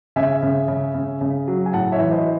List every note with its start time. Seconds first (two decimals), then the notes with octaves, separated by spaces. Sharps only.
0.16 C#3 E5 G#5
0.43 C#3
0.68 C#3
0.94 C#3
1.21 C#3
1.48 F#3
1.66 G#5
1.73 A2 F#5 A5
1.92 C#5 E5
1.99 E3
2.12 C5 D#5